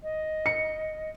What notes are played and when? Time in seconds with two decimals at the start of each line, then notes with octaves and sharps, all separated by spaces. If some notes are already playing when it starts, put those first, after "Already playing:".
0.03 D#5
0.46 C#7